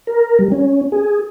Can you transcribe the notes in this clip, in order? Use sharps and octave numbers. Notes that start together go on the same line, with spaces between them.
A#4
G3
C#4
G#4